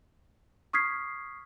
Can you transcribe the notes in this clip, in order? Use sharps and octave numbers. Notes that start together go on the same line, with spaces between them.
C#6 D#6 F6 G#6 B6 C7